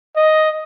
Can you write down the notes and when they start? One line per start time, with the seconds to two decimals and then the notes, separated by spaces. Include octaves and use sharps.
0.16 D#5